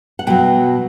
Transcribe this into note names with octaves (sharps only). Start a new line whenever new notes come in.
F#5
B2 F#3 G5